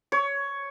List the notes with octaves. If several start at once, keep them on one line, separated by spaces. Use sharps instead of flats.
C#5